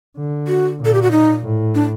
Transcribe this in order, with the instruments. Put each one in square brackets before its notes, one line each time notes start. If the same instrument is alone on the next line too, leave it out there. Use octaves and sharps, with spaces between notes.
[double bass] D3
[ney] F#4
[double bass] A#2
[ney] A4
G4
F#4
D#4
[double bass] A2
[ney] D4